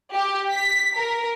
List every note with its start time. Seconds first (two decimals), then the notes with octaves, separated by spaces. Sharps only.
0.12 G4
0.49 B6
0.97 A#4